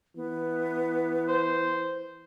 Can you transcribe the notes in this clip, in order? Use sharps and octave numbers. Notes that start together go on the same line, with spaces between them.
E3 B3
C5